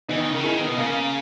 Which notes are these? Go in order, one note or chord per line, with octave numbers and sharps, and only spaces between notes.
E3 B3 D#4
D#3
C#3 A#4
D#3 E4 G#4
B3
B2
C#3 A#3